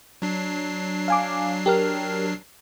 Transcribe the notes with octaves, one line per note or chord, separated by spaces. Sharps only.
F#3 D4 C7
F5 G#5 D6
G4 A#4 F6